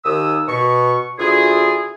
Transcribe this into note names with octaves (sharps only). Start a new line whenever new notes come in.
D#2 D#6 E6
B2 C#6
D2 E4 F4 G#4